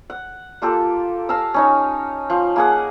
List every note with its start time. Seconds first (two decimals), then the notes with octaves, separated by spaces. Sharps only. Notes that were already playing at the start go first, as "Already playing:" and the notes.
0.10 F#5
0.62 A#3 F4 G4 A4
1.29 F5 A5 A#5 E6
1.54 C#4 D#4 C#5
2.30 F3 F5
2.56 A#3 G#4 F#5